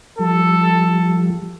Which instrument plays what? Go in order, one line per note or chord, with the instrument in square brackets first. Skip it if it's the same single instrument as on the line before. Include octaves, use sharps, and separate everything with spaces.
[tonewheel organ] F3 G3 [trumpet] A4